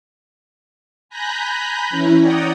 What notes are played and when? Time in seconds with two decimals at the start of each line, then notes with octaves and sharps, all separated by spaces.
1.09 G#5 A#5 B5 F#6 G6 A#6
1.90 E3 C#4 E4
2.20 C#5 D5 F#5 G5 A#5 D#6